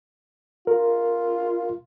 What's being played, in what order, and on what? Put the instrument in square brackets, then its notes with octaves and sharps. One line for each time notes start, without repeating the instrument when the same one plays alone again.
[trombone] F4 [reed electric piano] A#4